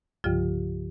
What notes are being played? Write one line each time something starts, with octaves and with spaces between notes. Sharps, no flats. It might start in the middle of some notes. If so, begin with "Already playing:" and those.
C2 G2 C#3 F3 F4 G4